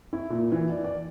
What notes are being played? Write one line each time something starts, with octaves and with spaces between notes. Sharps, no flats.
E4
A#2
E3
D5
D5